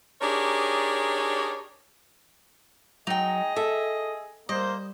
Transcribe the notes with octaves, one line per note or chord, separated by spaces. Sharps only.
D4 D#4 G4 G#4 A#4 C#5
F#3 D#4 G#4 D#5 G5
A4 E5
G3 A#3 C5 D#5